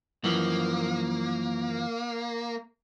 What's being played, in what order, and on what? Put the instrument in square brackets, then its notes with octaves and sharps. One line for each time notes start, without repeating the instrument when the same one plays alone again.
[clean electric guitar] F#2 E3 F3 [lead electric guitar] A#3